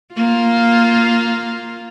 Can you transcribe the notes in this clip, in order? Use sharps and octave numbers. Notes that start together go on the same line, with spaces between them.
A#3 F4